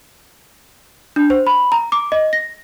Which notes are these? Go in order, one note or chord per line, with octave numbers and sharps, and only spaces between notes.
D4
C5
B5
A#5
D6
D#5
A#6